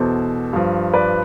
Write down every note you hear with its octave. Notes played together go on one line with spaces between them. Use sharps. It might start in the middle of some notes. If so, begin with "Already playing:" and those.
Already playing: E2 B2 A4 C5
G2 F3
B4 D5